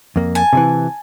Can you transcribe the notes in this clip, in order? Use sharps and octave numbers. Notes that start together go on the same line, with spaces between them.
F2 A#3
G#5 A5
C3 D#3 E3